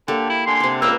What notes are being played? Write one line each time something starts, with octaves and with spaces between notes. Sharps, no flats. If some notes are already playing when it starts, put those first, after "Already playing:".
D3 A#3 G4 A4
E4
D3 G#5 C6
C3 D5
C#2 A#3 B4 D5 A#5 E6